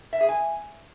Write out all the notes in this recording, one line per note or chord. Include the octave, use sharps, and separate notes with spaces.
E5
G#4
G#5